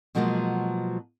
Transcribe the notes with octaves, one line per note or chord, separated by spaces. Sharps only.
B2 F3 F#3 G#3 A#3 B3